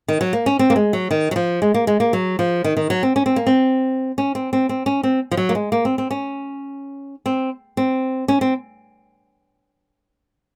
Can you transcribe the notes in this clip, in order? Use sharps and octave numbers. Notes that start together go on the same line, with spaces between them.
D#3
F#3
A#3
C#4
C4
A#3
G#3
F#3
D#3
F#3
F3
G#3
A#3
G#3
A#3
F#3
F3
D#3
D#3
F#3
C4
C#4
C4
A#3
C4
C#4
C4
C4
C4
C#4
C4
F3
F#3
A#3
G#3
A#3
C4
C4
C#4
C4
C4
C#4
C4